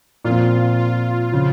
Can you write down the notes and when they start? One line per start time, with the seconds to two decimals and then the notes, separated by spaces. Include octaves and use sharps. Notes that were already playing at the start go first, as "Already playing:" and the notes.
0.24 A#2 F3 C4 F4
0.79 F4
1.32 C#3 F3